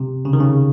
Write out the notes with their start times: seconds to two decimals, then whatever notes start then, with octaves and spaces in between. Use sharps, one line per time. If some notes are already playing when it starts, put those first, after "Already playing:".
Already playing: C3
0.25 C#3
0.33 D#3
0.40 C#3